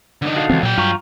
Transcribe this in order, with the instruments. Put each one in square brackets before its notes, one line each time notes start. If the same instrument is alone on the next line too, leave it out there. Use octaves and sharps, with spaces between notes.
[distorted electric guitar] D3 D#4
[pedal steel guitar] F#4 A4 F5
[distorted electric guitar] C#2 [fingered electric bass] E3 C4
[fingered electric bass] A#2 [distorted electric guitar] F#3 G5
[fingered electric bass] G2 [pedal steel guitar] F4 A#5 C#6